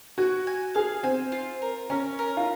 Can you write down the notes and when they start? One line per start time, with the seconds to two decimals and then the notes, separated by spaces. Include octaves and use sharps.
0.18 F#4 G#5
0.47 G#5
0.74 G#4 F5
1.03 C4 G#5
1.32 F4
1.62 A#4
1.90 C#4 A#4
2.19 A#4
2.37 F4